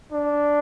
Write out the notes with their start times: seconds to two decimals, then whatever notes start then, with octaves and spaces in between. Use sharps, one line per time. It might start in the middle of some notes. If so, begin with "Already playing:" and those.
0.12 D4